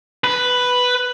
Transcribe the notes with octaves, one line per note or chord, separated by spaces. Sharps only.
B4